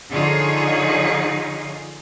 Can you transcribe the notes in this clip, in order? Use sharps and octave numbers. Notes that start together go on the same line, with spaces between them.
D3 F3 D#4 F4 G#4 C#5